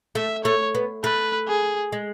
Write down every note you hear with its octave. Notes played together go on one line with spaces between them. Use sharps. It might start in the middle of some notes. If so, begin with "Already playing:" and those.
A3 E5
A3 C#5
B3
A3 B4
G#4
G#3